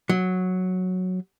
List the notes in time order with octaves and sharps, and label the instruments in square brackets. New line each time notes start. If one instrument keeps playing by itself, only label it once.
[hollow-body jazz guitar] F#3